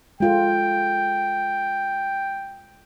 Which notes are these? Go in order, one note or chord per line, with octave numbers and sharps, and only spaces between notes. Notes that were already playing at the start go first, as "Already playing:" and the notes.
G#3 F4 A4 G5